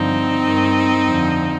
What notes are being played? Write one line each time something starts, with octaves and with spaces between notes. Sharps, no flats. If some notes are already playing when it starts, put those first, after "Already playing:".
Already playing: G2 D3 F3 C4 D#4
G2 D#3
F2 D3 F3